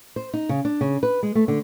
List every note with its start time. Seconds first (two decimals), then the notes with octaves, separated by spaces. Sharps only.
0.16 C5
0.33 D#4
0.49 C#3
0.65 D4
0.81 C#3
1.03 B4
1.23 G#3
1.35 A3
1.48 D3